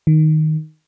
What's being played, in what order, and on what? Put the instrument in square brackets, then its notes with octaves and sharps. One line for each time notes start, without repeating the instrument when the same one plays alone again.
[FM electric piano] D#3